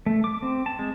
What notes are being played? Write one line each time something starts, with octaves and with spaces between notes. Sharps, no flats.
A3
D6
C4
A5
G#3